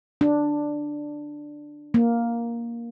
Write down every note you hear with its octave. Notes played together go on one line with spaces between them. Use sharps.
D4
A#3